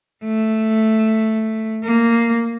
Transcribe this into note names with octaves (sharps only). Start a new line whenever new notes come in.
A3
A#3